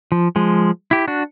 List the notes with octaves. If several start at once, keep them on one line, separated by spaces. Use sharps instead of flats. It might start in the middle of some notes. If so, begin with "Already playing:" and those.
F3
F3 G#3
E4 G4
D4 F#4